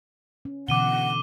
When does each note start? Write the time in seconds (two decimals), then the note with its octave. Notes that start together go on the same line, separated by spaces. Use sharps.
0.45 C#4
0.68 B2 D3 E3 F#5 D6 D#7 G7